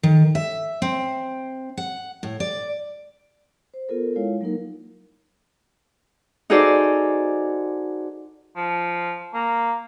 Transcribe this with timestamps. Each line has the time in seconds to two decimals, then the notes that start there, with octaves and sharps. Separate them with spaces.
0.03 D#3
0.35 E5
0.82 C4
1.77 F#5
2.23 A2
2.40 D5
3.74 C5
3.89 B3 F4 A4 A#4
4.16 G#3 E4 F4 C#5 F5
4.41 F#3 A#3 D#4 A#4
6.50 D#4 F#4 G#4 A4 C5 D5
8.56 F3
9.34 A#3